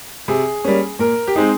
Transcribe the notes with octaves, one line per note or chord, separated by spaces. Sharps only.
C3 G#4
G3 A#3 C#4
A#2 A#4
G4
G#3 C4 D#4 G#4